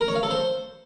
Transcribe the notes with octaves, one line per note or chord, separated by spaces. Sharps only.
A#4
C#5
F5
A4
C5